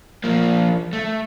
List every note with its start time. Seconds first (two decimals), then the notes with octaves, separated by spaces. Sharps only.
0.24 F3 A#3
0.93 A3